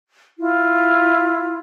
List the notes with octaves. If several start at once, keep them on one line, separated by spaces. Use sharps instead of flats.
E4 F4